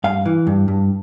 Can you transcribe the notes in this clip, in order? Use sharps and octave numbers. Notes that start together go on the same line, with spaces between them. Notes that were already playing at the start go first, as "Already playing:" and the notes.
G2 F5
E3
G2
G2